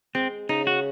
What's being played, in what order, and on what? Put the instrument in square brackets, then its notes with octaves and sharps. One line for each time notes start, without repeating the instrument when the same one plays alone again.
[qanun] G#3 [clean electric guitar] C4
[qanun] C#3 [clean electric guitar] D#4
[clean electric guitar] F#4